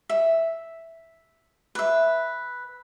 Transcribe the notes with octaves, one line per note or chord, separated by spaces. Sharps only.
E5
B4 E5